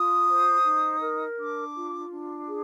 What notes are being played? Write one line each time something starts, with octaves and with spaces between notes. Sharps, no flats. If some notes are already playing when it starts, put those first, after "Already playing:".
Already playing: F4 D#6
C5
D#4
A#4
D4 D6
F4
D4
G#4